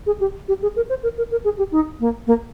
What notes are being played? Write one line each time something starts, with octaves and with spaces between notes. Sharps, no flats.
G#4
G4
G4
G#4
A#4
C5
A#4
A#4
A#4
G#4
G4
D#4
A#3
A#3